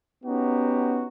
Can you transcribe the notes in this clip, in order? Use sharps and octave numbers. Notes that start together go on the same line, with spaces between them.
B3 C#4 D#4 F#4 G4